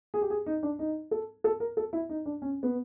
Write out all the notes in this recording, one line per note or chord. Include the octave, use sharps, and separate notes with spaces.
G#4
G4
G#4
D#4
D4
D#4
A4
A4
A#4
A4
E4
D#4
D4
C#4
B3